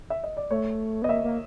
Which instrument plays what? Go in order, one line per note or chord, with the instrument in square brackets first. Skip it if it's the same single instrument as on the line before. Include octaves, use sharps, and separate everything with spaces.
[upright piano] E5
D#5
D5
[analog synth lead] A3 [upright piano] C#5
[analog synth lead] B3 [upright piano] D#5
[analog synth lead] A#3 [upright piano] E5
[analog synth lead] A#3